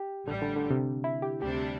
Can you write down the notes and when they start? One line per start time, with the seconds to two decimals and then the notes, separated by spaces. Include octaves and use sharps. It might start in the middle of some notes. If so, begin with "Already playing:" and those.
Already playing: G4
0.27 A1 A2 D3 G3
0.42 D3
0.56 D3
0.71 C3
1.04 E4
1.22 G4
1.41 D2 C3 G3 D4 G4